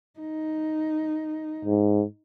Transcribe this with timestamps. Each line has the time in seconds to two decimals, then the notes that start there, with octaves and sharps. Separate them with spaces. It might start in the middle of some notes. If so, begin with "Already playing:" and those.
0.20 D#4
1.65 G#2